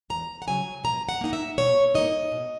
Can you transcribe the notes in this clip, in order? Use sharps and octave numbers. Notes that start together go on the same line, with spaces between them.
E2 A#5
F#5
C#3 F#3 G#5
B2 A#5
F#5
A#3 D#4 F#5
E5
B2 C#5
A#3 D#4 D#5
B2